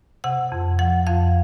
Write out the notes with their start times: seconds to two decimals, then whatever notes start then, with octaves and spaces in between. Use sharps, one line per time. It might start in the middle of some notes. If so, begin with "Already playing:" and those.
0.24 C3 F#5
0.52 F2
0.79 F3 F#5
1.07 F2 F5